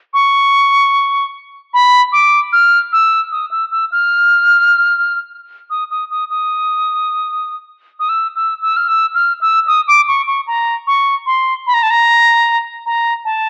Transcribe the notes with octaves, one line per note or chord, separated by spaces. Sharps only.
C#6
B5
D6
F6
E6
D#6
E6
E6
F6
D#6
D#6
D#6
D#6
D#6
E6
E6
E6
F6
E6
F6
E6
D#6
D6
C#6
C#6
A#5
C#6
C6
B5
A#5
A5
A#5
A#5
A5